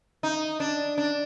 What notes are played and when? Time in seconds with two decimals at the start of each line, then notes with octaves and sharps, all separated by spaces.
0.23 D#4
0.60 D4
0.98 D4